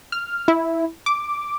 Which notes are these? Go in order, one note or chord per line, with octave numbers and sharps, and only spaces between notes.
F6
E4
D6